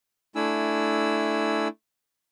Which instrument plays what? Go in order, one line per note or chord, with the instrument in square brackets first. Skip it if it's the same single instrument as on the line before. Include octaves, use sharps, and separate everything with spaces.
[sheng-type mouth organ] A3 D4 E4 G#5 E6